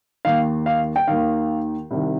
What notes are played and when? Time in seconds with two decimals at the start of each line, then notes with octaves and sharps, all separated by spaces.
0.25 D#2 D#3 F5
0.66 F5
0.96 G5
1.07 D#2 D#3 F5
1.91 C2 C3 D#3